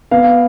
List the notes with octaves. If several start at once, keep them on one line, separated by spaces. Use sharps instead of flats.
B3 F5